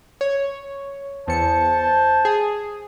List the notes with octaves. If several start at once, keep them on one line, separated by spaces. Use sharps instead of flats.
C#5
E2 C5 A5 C#7
G#4